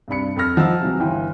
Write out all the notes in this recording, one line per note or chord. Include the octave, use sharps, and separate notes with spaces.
G2 C3 D4 B5 C#7
F2 A4 B5 E6 F6 A#6
F3 D#5 F#5 A#5 E6
C3 E3 F#3
G1 E3 E4 G5